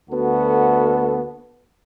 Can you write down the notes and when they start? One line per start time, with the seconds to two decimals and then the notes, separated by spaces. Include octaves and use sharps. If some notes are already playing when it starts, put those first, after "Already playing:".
0.10 D2 B3 F#4 A4